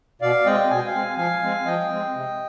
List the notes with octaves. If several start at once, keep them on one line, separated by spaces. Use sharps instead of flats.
B2 D5 F5
G#3 C4 D#5 G5
B2 G#5
G5
F5 G#5
G#3 C4
F3 F5 G#5
G#3 C4
F3 D#5 G5
G#3 C4
C3